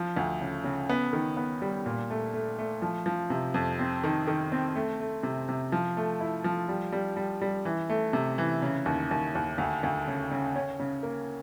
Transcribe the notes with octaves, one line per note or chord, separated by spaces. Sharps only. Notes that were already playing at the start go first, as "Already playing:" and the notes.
Already playing: F3
D2
C#3
C#3
B3
D#3
B3
G3
A#2
A3
A3
A3
F3
F3
C3
F2
C4
D#3
D#3
C4
A3
A3
C3
C3
F3
A3
E4
F3
G3
G3
G3
G3
E3
A3
C3
E3
C#3
D#2
D#2
D#2
D2
D2
C#3
C#3
C#4
C#3
A#3